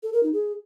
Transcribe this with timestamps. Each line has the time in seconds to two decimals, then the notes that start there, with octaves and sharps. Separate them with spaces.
0.03 A4
0.13 A#4
0.23 D#4
0.33 G#4